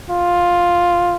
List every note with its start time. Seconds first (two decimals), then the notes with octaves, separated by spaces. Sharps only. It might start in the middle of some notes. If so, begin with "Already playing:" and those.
0.10 F4